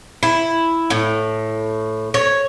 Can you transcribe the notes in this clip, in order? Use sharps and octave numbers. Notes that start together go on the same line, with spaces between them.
E4
A2
C#5